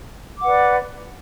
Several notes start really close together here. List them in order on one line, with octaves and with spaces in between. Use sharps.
D6 F#5 B4 D5